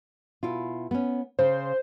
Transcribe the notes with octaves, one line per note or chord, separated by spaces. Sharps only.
B2 E4 F4
B3 C#4
C#3 C5